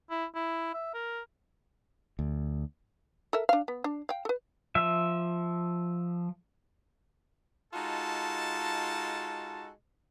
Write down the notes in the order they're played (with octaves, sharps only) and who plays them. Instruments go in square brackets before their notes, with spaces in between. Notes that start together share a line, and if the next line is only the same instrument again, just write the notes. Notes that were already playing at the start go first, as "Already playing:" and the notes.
[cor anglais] E4
E4
E5
A#4
[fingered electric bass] D2
[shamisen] A4 A#4 E5
D4 F5
B3
D4
F5 G5
A4 B4
[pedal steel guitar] F3 E5
[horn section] G#3 D#4 F4 F#4 A4 A5